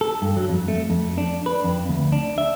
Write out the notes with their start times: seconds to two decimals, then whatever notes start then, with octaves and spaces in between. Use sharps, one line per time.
0.01 A4
0.22 G2
0.37 F#3
0.49 F2
0.68 A3
0.90 F2
1.18 D4
1.46 B4
1.64 F2
1.89 D2
2.12 D4
2.38 E5